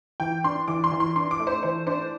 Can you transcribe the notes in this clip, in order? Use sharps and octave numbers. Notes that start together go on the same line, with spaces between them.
E3 G5
D4 C6
E3 D6
C6
E3
C6
D4 C6
D6
A3
C5
E3 C5
D4 C5